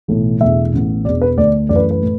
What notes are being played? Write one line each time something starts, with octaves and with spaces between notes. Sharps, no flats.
B1 A2 E3 A3
E1 E2 E3 A3 E5
A1 A2 E3 B3
E1 E2 B2 D5
B4
D2 D3 A3 D5
F#2 E3 A3 D5
B4
B4
A2